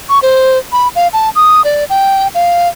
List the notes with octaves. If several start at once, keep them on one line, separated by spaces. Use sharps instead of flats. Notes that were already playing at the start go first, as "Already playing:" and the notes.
C#6
C5
B5
F5
A5
D#6
D5
G5
F5